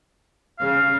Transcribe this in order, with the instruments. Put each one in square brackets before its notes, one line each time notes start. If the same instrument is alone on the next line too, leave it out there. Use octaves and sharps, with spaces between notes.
[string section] C#3 [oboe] F5